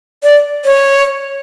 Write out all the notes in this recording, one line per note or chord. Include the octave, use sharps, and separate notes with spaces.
D5
C#5